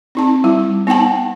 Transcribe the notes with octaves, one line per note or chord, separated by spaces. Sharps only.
C4 D#4 A5
G3 E4
B3 D#4 F#5 G5 A5